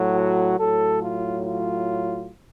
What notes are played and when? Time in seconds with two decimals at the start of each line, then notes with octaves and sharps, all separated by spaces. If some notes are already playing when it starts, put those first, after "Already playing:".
Already playing: A2 F#3
0.15 F#4
0.58 A2 F#3 A4
1.00 F4
1.43 F4